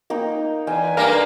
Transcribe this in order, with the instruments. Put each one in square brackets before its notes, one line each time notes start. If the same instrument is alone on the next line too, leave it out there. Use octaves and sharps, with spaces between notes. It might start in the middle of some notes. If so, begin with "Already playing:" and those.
[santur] A#3 D#4 G5
[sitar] E2 [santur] G5 [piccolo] G#5
[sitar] G2 A3 A#3 [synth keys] A#4